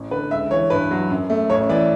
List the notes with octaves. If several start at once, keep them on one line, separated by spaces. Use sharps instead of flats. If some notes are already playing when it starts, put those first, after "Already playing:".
Already playing: A1
D3 B4
C#2 E5
E3 C#5
G2 B4
F#3
F#2
A3
A1 C#5
E3 D5